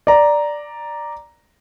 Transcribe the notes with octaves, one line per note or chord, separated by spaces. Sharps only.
D5 A#5